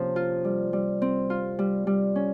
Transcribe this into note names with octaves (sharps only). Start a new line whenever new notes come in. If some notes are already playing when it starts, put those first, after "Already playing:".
Already playing: C3 F3 A#3 C#4
F4
G3
G3
C4
F4
G3
G3
C#4